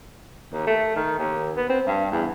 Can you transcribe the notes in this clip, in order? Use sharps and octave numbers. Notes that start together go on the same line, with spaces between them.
D#2
A3
D#3
D#2
B3
C4
G2
E2